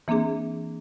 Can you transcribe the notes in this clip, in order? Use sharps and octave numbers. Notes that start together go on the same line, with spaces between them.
E3 A#3 C4 D4 G#4